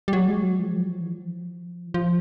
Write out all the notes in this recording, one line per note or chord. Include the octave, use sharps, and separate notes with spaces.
G3
F#3
G#3
F#3
F3
F#3
F3
E3
F3
E3
F3